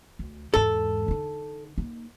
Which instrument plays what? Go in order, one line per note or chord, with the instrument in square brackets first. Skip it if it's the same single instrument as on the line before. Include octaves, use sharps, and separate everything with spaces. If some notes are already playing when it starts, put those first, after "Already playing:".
[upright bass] D2
[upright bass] E2 G#2 [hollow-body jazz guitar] A4
[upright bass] D3 D#4
A#3 D#4